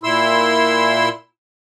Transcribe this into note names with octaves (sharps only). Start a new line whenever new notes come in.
A#2 E4 C6 E6